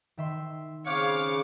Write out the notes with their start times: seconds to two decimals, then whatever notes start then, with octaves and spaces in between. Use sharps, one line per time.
0.17 D#3 E5 C6
0.86 C#3 C4 C#5 F5 D6 F#6 G6